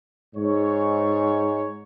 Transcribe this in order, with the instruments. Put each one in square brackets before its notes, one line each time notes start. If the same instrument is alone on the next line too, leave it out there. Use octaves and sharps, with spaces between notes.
[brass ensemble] G#2 C#5